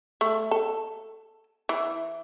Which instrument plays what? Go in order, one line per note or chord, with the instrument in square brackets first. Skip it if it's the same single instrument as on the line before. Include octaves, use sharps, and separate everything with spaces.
[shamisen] A3
A4
E3